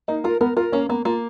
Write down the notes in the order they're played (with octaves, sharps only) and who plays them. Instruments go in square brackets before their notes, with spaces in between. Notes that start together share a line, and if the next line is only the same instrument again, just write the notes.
[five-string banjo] A#3 [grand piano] D#4
[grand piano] F4 [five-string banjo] A#4
[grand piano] B3 [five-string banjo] A#4
[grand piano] F4 [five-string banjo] A#4
[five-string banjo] A#3 [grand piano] C#4
[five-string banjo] A#3 [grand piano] B3
[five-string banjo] A#3 [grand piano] F4